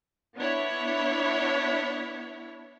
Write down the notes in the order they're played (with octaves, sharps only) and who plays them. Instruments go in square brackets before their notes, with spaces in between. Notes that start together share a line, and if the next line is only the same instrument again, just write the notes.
[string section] B3 D4 E4 C#5